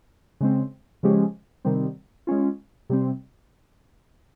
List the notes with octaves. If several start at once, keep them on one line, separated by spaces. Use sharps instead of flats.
C#3 G#3 C4
C#3 F3 G#3 C#4 G4
C3 D#3 G3 C4
G#3 C#4 F4
C3 G3 C4